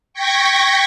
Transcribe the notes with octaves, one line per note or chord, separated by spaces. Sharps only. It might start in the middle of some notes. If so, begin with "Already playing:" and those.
G5 C#6 G#6 A#6 B6